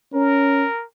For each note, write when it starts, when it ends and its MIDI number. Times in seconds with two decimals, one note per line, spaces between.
0.13 0.66 61
0.13 0.84 70